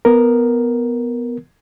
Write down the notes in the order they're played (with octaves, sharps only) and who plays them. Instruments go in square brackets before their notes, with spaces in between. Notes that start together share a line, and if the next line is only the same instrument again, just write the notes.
[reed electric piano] B3 A#4